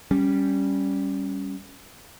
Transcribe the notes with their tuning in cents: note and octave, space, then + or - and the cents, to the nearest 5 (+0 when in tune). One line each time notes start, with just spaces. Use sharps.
G3 +0 C#4 +0